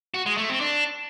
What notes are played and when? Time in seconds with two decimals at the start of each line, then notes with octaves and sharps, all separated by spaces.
0.14 F#4
0.26 G#3
0.38 A3
0.49 C4
0.61 D4